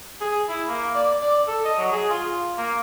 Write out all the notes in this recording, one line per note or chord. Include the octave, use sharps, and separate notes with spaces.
G#4
E4
A#3
D5
D5
A4
D#5
F#3
G#4
F4
A#3